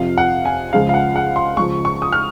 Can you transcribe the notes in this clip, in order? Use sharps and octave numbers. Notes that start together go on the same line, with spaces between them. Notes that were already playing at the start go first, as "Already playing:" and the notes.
Already playing: F2 C3 F3 F5
F#5
G#5
C#2 C#3 F3 G#3 F5
F5
F#5
F#5
C6
C#2 C#3 F3 C#6
C#6
D#6
F6